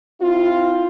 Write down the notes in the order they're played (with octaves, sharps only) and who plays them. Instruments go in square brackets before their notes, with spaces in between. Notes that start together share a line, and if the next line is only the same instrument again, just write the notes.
[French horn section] C4 E4 F4